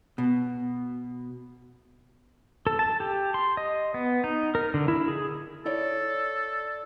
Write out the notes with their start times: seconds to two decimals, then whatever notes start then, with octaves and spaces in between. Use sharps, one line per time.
0.18 B2
2.67 A4
2.79 A5
3.00 G4
3.34 C6
3.57 D#5
3.94 B3
4.24 D#4
4.55 A#4
4.74 D3
4.88 E4
5.08 G#4
5.65 E4 A4 C#5 D5